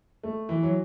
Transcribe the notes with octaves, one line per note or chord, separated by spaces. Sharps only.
A3
E3
F#3